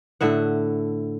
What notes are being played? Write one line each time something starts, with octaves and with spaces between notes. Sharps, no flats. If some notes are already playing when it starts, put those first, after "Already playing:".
A2 D3 E5 F#5